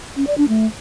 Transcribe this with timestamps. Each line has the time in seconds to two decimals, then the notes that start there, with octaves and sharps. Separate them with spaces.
0.16 C#4
0.27 D5
0.38 D4
0.48 A3